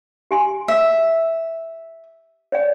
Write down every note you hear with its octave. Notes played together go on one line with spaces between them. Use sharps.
G4 G#5 C6
E5 E6
C#5 D5 G5